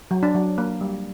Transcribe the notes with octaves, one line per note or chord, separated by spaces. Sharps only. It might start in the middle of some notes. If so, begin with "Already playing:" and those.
F#3
D4
F#3
A#3
G3